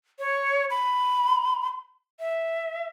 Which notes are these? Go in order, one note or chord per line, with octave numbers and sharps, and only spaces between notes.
C#5
B5
E5